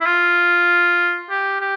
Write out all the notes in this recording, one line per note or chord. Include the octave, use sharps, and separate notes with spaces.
E4
F4
G4
G4